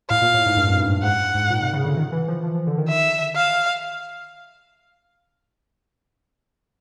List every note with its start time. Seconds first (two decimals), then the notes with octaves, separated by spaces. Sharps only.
0.10 A2 F5
0.22 A#2
0.34 A2
0.46 G#2
0.56 G2
0.68 F#2
0.80 G2
0.92 G2
1.03 G#2 F#5
1.34 G#2
1.50 A#2
1.62 C3
1.73 C#3
1.85 D3
1.97 D#3
2.12 E3
2.28 F3
2.43 F3
2.55 F3
2.67 D3
2.78 D#3
2.89 E5
3.36 F5